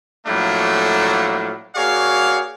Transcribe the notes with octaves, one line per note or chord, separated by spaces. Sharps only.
A2 F3 F#3 A3 A#3 D4
A#3 F#4 G#4 C#5 D5 F5